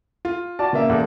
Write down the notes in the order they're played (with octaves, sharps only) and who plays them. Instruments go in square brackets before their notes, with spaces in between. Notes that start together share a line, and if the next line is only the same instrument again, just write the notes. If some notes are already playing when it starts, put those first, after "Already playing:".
[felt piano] F4
[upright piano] F#4 D5 A5
C#3 A#3 E5
[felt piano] E2 A4